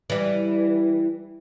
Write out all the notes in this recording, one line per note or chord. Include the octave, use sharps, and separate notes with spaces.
E3 G3